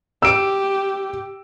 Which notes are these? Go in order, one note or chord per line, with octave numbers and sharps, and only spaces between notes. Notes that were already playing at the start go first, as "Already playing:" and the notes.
G4 E6 D7